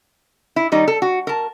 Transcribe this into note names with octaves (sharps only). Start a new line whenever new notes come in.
E4
D#3 G3 D#4
A4
F#4
A#4 A5